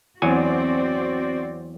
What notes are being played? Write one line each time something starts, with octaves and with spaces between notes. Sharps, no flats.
E2 F#3 C4 F#4 D5 G#5